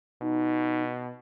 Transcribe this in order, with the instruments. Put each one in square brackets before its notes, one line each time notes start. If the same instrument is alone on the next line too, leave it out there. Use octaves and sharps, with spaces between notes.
[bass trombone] B2 [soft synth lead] D#4